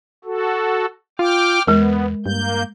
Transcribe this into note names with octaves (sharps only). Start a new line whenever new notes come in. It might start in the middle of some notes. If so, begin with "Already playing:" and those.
F#4 A4
F4 G5 D6 F6
E2 G#3 B3 A#4
G2 A#3 G6